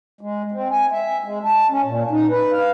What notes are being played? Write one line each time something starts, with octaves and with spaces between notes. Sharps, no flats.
G#3
C4
G#5
E5
G#3
A5
C#4
A#2
D#4
B4
F5